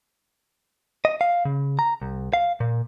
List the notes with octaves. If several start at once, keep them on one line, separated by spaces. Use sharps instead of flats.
D#5
F5
C#3
A#5
C2
F5
A#2